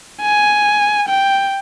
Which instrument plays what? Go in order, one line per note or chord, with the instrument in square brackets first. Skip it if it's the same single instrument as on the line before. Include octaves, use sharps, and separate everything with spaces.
[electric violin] G#5
G5